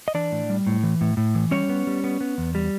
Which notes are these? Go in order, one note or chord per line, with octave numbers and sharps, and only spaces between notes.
D#5
E3 D4 D5
A2
G3
A2
E3
A2
A2
E3
G3 C#4 C#5
B3
G3
B3
B3
E2
G3